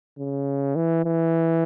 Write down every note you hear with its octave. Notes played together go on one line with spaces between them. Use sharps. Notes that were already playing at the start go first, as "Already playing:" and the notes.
C#3
E3
E3